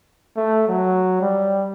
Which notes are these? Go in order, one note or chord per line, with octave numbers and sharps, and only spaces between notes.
A3
F#3
G3